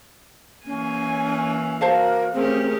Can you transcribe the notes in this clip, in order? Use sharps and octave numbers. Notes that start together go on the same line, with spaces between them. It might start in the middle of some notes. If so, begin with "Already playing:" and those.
E3 A#3 C#4 G#5
F#4 A#4 C5 F5 A5
A3 C4 C#4 G4 G#4 A#4